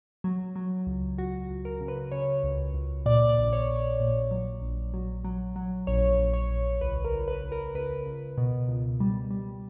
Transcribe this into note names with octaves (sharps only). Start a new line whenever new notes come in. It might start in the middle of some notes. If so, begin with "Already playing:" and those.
F#3
F#3
C#2
C#2 F#4
C#2
A#4
C#3
B4
C#3 C#5
C#2
C#2
A#2 D5
D5
A#1
C#5
A#1
C#5
A#2
F#3
A#1
F#3
F#3
F#3
A#1 C#5
A#1
C#5
A#1
C#2 B4
A#4
C#2
B4
C#2
A#4
C#2 B4
C#2
B2
C#2
G3
G3